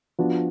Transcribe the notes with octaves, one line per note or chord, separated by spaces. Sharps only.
F3 B3 D4 F#4